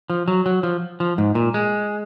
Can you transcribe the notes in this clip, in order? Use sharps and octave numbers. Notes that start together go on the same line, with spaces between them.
F3
F#3
F#3
F3
F3
G#2
A#2
G#3